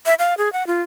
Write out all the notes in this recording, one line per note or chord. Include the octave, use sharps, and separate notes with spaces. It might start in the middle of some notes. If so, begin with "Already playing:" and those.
E5
F5
G#4
F#5
F4